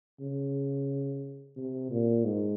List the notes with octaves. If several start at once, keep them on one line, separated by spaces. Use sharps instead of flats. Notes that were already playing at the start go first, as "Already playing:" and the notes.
C#3
C3
A#2
G#2